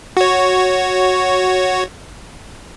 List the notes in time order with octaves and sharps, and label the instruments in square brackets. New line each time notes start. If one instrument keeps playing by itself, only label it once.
[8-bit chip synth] F#4 C#5